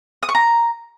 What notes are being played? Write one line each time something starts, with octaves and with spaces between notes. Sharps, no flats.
D#6
C#6
A#5